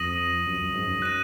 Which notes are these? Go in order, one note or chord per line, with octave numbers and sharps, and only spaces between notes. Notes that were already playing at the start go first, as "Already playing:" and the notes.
Already playing: F2 D#6 A#6 D#7 F#7
F#2
F#2
G#2
F#2
F#6 A#6 D#7